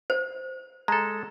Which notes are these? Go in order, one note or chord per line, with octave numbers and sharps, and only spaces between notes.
C5
G#3 A4 A#5